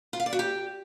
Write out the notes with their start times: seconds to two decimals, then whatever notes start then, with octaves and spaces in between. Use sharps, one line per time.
0.13 F4
0.20 F5
0.26 D5
0.33 F#4
0.39 G4